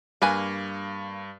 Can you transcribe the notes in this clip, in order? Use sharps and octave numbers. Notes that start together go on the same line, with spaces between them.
G2 A#3 B4 G#5